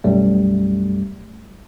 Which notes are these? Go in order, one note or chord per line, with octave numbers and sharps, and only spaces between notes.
B1 F#2 G3 A3